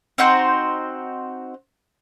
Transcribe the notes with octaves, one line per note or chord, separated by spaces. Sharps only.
C4 D#4 F#4 C5